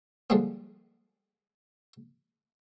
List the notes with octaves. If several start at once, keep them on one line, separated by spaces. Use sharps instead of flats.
D3 F3 G3 G#3 A#3 B3